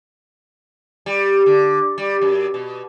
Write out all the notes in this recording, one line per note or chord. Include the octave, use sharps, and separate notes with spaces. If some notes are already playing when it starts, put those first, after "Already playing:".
G3
D3
G3
F#2
B2